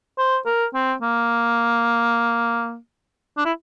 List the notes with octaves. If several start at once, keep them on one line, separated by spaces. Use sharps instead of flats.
C5
A#4
C4
A#3
D4
E4